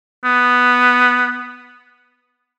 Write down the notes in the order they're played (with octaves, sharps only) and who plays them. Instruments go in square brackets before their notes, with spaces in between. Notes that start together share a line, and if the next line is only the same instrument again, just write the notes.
[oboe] B3